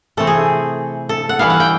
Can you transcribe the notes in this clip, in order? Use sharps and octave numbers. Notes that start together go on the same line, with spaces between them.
C3 E3 A3 C4 A4
G#4
A4
F#5
E3 G3 B3 E4 F5
F#5
G5